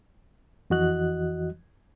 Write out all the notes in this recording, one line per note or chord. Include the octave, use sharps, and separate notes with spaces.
F2 E3 F#4 D#5 F#6